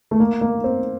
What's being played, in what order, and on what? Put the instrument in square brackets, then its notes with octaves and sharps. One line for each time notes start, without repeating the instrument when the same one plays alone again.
[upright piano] A3
A#3
A#3
C4